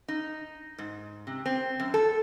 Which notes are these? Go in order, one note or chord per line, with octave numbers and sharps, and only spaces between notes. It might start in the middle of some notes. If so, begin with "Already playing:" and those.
D#4
G#2
C3
C4
F#2
A4